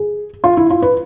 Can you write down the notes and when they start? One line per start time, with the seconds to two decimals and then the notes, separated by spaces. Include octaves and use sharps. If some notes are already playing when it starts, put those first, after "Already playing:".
Already playing: G#4
0.44 F4
0.57 E4
0.70 F4
0.82 B4